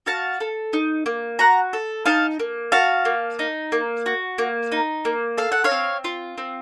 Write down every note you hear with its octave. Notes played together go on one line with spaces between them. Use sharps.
F#4 F5 A5
A4
D#4
A#3
F#4 F#5 A#5
A4
D#4 F5 A5
A#3
F#4 F5 A5
A#3
D#4
A#3
F#4
A#3
D#4
A#3
A4 F5
F#5
C#5 F5
C4
F4
C4